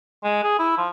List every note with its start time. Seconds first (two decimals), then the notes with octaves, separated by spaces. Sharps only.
0.24 G#3
0.44 G#4
0.59 E4
0.78 F3